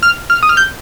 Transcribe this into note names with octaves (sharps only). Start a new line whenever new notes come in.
F6
F6
D#6
F6
G6